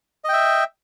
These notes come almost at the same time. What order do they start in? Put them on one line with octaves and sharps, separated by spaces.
D#5 G5 E5